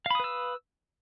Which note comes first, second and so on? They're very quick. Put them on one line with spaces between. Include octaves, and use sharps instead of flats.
F5 B5 D#6 B4 E6